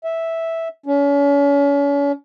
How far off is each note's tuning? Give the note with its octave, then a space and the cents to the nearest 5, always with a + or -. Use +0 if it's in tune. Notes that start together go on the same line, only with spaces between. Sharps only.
E5 -5
C#4 +40